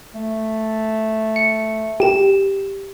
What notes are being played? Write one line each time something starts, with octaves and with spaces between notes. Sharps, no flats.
A3
C#7
G4 E7